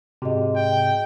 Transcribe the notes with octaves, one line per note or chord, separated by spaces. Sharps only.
G#2 C3 F#4 G#4 D#5
G5